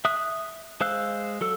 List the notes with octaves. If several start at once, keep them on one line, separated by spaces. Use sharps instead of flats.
E5 D#6 F#6
G#3 C5 F5 E6 F#6
F#3 A4 E6